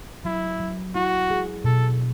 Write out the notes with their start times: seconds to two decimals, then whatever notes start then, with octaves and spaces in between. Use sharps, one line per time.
0.25 F#3 E4
0.60 F#3
0.95 E4 F#4
1.30 G#4
1.64 B2 A4